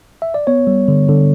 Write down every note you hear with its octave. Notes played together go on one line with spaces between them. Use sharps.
E5
D5
B3 C#5
G3
D3
D3